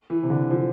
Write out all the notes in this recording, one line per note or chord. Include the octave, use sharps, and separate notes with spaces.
E3
C3
D3
F3